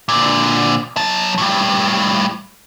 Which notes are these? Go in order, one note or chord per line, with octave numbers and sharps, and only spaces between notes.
A#2 D3
F#3 A5
A2 G3